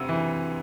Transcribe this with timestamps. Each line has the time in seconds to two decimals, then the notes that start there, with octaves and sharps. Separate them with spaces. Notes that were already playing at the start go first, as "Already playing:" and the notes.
Already playing: D2 C3 E6
0.09 E3